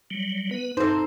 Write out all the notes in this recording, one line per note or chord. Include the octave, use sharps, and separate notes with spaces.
F#3 G3
B3 B4
G2 A#2 C4 D#4 A4 C5